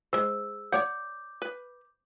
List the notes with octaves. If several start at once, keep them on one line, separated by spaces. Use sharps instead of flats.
G#3 C5 E6
C#5 D5 F#5 D6 G6
B4